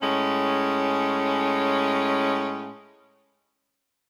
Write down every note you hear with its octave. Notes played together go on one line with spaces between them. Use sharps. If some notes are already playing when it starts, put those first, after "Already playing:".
A2 G#3 C#4